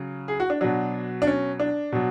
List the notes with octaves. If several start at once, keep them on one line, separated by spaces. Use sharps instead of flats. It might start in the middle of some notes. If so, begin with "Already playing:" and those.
Already playing: C#3 F#3
G#4
F#4
D4
B2 F#3 D4
D4
C#4
D4
B2 F#3